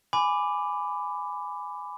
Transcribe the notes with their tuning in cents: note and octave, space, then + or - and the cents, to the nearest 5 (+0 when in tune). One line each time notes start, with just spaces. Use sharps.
G#5 +0 B5 +15 D6 +0